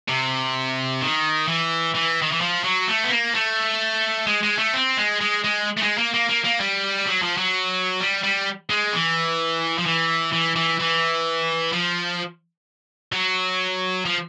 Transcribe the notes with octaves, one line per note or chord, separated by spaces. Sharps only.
C3
D#3
E3
E3
D#3
E3
F3
F#3
A3
B3
A#3
A3
G#3
G#3
A3
C4
G#3
G#3
G#3
A3
G#3
A#3
A#3
A#3
A#3
G3
F#3
F3
F#3
G3
G3
G#3
E3
F3
E3
E3
E3
E3
F3
F#3
F3